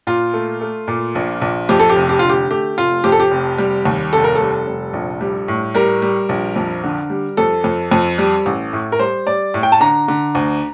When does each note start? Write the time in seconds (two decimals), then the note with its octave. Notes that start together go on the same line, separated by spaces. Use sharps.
0.07 A#2 F4
0.34 A3
0.61 A3
0.88 A#2
1.15 A#1
1.41 A#1
1.69 F2 G4
1.80 A4
1.89 G4
1.96 F1
2.09 G4
2.19 D3 F4
2.29 G4
2.50 A3 G4
2.78 F1 F4
3.04 F2 G4
3.12 A4
3.20 G4
3.31 F1
3.58 G3
3.85 D#2
4.13 F1 A4
4.24 A#4
4.35 G3 A4
4.67 F1
4.93 A#1
5.21 G3
5.48 A2
5.75 G3 A#4
6.02 G3
6.29 A#1
6.56 F2
6.84 D3
7.10 G3
7.37 F2 A4
7.64 F2
7.91 F2
8.18 G3
8.46 A1
8.73 A2
8.92 A#4
8.99 G3 C5
9.27 G3 D5
9.54 A2
9.63 G5
9.72 A5
9.80 D3 A#5
10.08 D3
10.35 D2